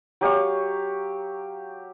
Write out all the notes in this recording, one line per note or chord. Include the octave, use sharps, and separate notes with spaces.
F#3 G4 F5 C#6